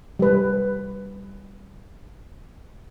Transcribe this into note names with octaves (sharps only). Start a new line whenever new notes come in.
G3 B4